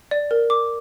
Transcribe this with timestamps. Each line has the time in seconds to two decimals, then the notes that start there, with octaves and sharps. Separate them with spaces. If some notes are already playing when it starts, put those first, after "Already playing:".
0.11 D5
0.31 A#4
0.50 D6